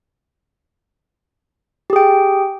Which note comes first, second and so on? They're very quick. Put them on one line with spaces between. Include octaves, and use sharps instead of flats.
G4 G#4 G5